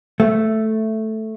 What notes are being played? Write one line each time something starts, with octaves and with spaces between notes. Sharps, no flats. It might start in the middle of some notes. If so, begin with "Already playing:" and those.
A3